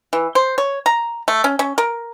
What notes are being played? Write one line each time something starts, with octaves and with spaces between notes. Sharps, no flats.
E3
C5
C#5
A#5
A3
C#4
C#4
A#4